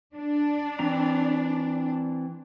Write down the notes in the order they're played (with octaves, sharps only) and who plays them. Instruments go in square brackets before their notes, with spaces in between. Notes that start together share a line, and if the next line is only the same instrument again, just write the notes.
[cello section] D4
[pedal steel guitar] E3 C4 A#5